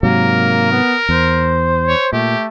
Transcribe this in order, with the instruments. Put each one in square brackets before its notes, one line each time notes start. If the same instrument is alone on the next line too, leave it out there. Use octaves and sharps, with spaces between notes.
[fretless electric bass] G#2 C3 F#3 [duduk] A#3 [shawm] A#4
[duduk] B3
[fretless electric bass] E2 [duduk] C5
[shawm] C#5
[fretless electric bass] A#2 [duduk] A3 [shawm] G4